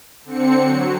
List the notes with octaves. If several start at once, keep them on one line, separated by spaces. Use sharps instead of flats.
D3 C4 C#7
F#3